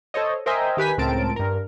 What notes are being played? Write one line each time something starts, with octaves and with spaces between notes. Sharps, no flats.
A4 C5 C#5 D#5
A#4 C5 D#5 E5 G5 G#5
D#3 G4 B4 G#5 B6
C#2 A2 C4 A#4 A5 D7
G2 A#4